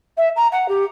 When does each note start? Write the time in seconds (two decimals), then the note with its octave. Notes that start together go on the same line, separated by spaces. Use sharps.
0.17 E5
0.36 A#5
0.52 F#5
0.68 G4